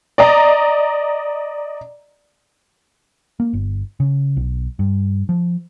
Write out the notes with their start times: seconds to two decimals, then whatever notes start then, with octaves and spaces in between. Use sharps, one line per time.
0.18 D5 D#5 A#5
3.40 A#3
3.53 G1
4.00 C#3
4.37 B1
4.79 G2
5.29 F3